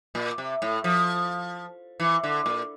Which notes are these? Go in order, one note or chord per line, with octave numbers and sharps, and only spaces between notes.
A#2
C3
A2
F3
E3
D3
A#2